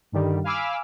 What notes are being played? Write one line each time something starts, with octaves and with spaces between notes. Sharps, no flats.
G2 D3 D#3 G3
F5 G#5 B5 D6 E6 F6